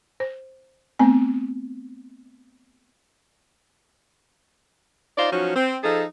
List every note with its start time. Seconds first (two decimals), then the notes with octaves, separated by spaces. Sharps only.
0.20 C5
0.99 A3 B3 C4 G#5
5.17 D#4 F4 C5 D5
5.31 F3 F#3 C#4 D#4 F#4
5.55 C4
5.83 F3 D#4 G#4 A4